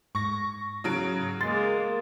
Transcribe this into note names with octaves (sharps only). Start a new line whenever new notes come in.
G#2 C#6 A#6
C#3 F#3 D7
G#3 A#3 C6 A6